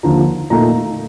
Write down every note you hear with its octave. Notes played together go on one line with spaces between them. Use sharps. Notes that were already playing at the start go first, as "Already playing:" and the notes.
D#2 D3 F3 A#5
A#2 A3 D#4 A#5